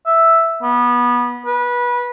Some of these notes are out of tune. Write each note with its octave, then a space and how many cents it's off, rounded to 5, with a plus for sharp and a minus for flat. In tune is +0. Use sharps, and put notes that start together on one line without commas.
E5 +0
B3 -20
B4 -20